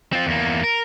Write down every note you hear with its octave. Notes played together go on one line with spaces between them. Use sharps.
C4 F4
E2 A#3
A#4